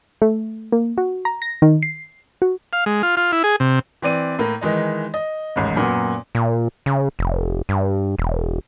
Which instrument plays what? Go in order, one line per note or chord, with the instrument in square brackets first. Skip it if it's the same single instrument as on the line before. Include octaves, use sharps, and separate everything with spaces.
[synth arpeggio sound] A3
A#3
F#4
A#5
A#6
D#3
C7
F#4
[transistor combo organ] F5
G#3
F4
F4
E4
G#4
C3
[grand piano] E3 C4 D5 D#7
A2 A#3
D#3 E3 G#3 D#4
D#5
A1 D#2 G#2
F#2 A#2 F#3 B3
[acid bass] A#2
C#3
F1
G2
E1